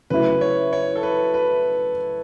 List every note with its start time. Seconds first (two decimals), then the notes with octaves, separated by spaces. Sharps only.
0.10 C#3 F#3 A3 E4 B4
0.41 C#5
0.73 C#5
0.95 A4
1.03 B4
1.34 B4